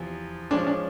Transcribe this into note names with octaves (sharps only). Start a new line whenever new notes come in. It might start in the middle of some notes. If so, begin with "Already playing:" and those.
Already playing: E2 C3 F3
F3 G#3 C#4 D4
D4